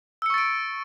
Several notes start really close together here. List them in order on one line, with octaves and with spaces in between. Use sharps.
E6 C#7 C#6 A6 D7